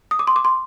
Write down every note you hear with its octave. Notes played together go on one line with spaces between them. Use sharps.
D#6
D6
C6
D6
C6